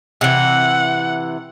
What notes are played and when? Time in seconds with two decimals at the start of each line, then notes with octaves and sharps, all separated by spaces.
0.21 C3 E3 F#5